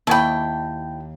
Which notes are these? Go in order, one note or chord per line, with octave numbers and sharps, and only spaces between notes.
D#2 E4 C#5 G5 A5 B5